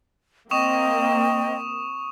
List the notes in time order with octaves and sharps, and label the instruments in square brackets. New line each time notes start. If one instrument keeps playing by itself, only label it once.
[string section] A#3 C4 [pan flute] D#5 [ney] G5 [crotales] C#6 D#6 E7